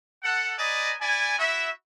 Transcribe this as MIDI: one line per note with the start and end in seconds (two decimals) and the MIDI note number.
0.23 0.54 69
0.23 0.54 78
0.58 0.93 71
0.58 0.93 74
0.58 0.93 75
0.58 0.93 80
0.58 0.93 82
1.01 1.36 64
1.01 1.36 74
1.01 1.36 80
1.38 1.69 64
1.38 1.69 66
1.38 1.69 76